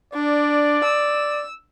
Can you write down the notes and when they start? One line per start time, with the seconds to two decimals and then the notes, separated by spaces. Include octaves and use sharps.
0.14 D4 D5
0.84 E6